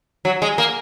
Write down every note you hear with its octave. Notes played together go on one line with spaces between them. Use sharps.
F#3
G#3
A#3